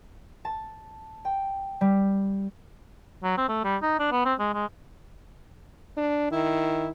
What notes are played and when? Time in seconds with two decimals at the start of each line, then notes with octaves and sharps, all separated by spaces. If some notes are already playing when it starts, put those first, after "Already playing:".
0.45 A5
1.25 G5
1.81 G3
3.24 F#3
3.38 C4
3.49 A3
3.64 G3
3.82 D#4
3.99 D4
4.12 B3
4.25 C4
4.39 G#3
4.54 G#3
5.97 D4
6.32 D#3 E4